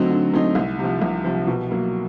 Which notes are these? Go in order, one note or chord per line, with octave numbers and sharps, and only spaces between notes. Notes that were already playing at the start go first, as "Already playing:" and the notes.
Already playing: D3 F#3 A3 C4 D#4
D3
F#3 A3 C4 D#4
C2
C3 F3
C2
C3 F3
B2
F#3 A#3